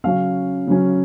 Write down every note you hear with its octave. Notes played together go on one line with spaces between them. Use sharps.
C#3 F#3 C#4 F5
C#3 F#3 C#4